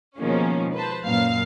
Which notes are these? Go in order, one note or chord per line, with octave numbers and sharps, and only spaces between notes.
B2 D#3 F3 G#3 A#3 C#4
B4 C5 A5
F#2 A#2 F5 C7